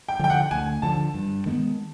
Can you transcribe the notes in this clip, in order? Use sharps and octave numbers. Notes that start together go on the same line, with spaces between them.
G5
D3 F3 G5
F#5
D2 G#5
D3 F3 A5
G2
D#3 G#3 B3